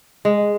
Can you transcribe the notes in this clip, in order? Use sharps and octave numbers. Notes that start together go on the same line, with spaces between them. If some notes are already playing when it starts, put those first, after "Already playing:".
G#3